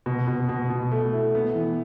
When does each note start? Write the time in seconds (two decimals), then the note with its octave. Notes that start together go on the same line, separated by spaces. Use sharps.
0.06 B2
0.28 B2
0.49 B2
0.70 B2
0.91 A3
1.12 E4
1.35 B3
1.55 E3